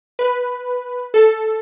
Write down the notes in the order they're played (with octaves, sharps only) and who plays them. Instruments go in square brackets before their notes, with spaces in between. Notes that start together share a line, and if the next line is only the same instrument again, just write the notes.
[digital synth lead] B4
A4